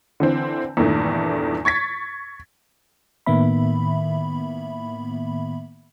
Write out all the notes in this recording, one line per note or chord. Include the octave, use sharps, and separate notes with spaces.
D3 E3 C4
E2 G2 A#2 D#3 E3 A3
C#6 G#6 A6 B6
A2 D#3 A#3 B3 E5 B5